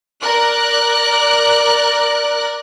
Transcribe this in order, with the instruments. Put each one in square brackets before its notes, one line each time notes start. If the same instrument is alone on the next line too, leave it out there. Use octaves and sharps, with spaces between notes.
[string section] A#4 D5 F#6